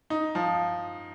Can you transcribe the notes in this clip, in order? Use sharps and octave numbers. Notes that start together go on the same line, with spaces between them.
D#4
F3